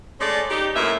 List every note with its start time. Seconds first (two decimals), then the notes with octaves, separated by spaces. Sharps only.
0.20 G#3 A3 C#4 D5
0.50 D#4 G4
0.75 F#2 A2 G#3 A#3 B4 E5